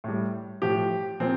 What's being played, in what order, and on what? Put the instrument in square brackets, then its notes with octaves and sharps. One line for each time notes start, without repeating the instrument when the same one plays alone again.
[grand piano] A2 G3
A2 F3 G4
A#2 F3 C4